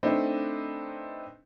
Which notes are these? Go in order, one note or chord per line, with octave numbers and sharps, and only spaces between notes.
A3 C4 D4 D#4 B4